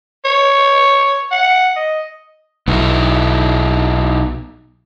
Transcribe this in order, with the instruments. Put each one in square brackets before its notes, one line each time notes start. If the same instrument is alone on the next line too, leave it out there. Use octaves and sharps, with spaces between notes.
[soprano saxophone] C#5
F#5
D#5
[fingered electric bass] B1 [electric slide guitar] B3 D#4 E4